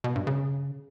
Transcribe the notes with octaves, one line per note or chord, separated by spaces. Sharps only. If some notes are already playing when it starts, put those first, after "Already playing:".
B2
G2
C#3